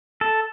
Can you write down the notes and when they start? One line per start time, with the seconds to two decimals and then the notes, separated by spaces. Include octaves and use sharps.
0.21 A4